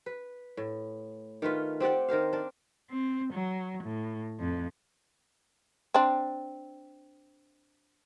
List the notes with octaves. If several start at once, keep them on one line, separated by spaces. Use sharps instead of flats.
B4
A2
D#3 A3 F4 B4
C4 G4 D5 F#5
D#3 A#4 C5 F5
D4 D5
C4
F#3
A2
F2
C4 D4